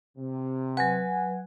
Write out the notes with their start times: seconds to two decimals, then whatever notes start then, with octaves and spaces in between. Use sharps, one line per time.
0.17 C3
0.77 F#3 B4 F#5 G#5